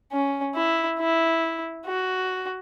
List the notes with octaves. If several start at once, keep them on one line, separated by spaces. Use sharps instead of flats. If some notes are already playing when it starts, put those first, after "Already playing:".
C#4
E4
E4
F#4